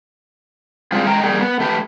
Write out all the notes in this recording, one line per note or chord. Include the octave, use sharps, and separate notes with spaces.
G3 G#3 C4 F4 G4 G#4
G#3 D#5 G5 A#5
G3 A#3 G#4 G5
B3
A3 G4 B4